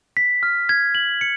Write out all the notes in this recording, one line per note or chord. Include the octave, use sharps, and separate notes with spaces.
B6
F6
G#6
F#7
C#7